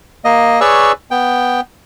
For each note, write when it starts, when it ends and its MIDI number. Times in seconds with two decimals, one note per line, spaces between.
0.25 0.60 58
0.25 0.60 75
0.61 0.92 68
0.61 0.92 71
0.61 0.92 73
0.61 0.92 74
0.61 0.92 85
0.61 0.92 88
1.11 1.61 59
1.11 1.61 79